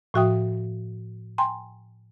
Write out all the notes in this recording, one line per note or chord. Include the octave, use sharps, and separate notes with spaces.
A2 F3 F#4 E5 G5 D#6
G5 G#5 A#5 C6